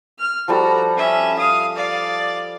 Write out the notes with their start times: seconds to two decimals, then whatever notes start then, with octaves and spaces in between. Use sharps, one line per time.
0.19 F6
0.48 F3 G3 F#4 A4 A#5
0.96 C#4 E5
1.38 F5 D#6
1.76 D5 F5